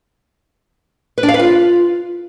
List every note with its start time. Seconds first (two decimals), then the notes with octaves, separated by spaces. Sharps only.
1.18 B4
1.23 D4
1.29 F5
1.34 B4
1.39 F4